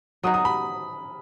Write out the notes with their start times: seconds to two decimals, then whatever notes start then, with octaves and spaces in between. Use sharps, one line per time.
0.23 F#3 B3 D#4 D#6
0.34 D#6
0.45 B5